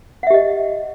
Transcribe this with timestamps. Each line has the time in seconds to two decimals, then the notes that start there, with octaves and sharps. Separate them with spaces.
0.23 F#5
0.27 E5
0.30 G4
0.34 D#5